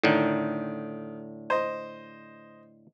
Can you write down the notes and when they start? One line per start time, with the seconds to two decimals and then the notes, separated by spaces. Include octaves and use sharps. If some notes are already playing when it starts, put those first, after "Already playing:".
0.04 A2 D3 D#3
1.50 C5 D#5